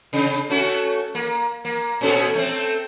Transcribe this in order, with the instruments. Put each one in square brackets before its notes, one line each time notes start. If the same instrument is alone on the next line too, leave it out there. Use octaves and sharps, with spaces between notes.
[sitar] C3
A3 C#4 F#4
A#3
A#3
A#2 C#4 A4
A3 C4